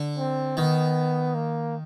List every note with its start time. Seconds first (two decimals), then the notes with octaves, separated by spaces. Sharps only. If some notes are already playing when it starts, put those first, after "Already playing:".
Already playing: D3
0.18 C4
0.57 D#3 B3
1.35 A#3